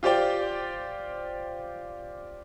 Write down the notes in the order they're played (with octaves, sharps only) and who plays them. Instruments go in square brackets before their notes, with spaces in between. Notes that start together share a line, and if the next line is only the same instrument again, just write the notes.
[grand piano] F4 G4 C5 D5 G5